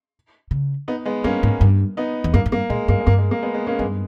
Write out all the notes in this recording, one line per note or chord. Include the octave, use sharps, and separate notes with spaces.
C#3
B3 D#4
G#3 B3
G2 A#3 C#4
G#2
G2
B3 D#4
E2
G2 A#3
G#2
G2 A#3
A#2 G#3
G2 A#3
G#3
G2 A#3
G#3
A#3
G#3 B3
G#3 B3
A#3 C#4
G2 G#3 B3